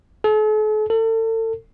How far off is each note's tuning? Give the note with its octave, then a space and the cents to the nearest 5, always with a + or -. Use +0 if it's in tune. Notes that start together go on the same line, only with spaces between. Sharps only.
A4 -45
A4 +35